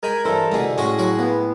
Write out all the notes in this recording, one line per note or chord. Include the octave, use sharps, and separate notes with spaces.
G#3 A#4 G5 G#5 B5
G2 E3 A4 C5
C2 B2 D3 A3 G#4
A2 G#3 C#4 F#4 C6 A#6
F#3 F#4 A#4 F#5
A#3 B3